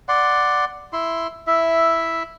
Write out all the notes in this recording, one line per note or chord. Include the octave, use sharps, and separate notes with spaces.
D5 F#5 C6
E4 C6
E4 E5